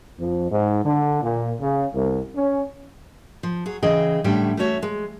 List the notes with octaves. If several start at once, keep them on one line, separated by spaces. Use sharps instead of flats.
F2
G#2
D3
A#2
C#3
C2
C#4
F3
F#3 G#4
C#3 E3 G#4 D#5 G5
A2 D3 G3 C#4 E5 G5
A3 C#4 F#4 C#5 E5
G#3